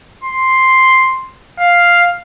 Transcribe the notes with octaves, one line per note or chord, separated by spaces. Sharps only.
C6
F5